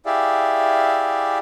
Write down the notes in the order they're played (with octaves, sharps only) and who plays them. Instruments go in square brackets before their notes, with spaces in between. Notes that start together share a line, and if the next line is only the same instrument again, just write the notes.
[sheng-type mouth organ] E4 G4 G#4 D5 E5 F5